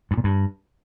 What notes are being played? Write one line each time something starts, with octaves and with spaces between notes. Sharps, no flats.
G2
A#2
G2